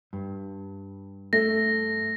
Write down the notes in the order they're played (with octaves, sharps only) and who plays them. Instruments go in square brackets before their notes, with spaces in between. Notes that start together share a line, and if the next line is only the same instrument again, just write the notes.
[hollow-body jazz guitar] G2
[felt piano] A3 [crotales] A#6